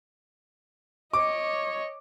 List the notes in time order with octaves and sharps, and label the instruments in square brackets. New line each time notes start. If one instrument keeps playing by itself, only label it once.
[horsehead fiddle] C#5 D#5 [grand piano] D6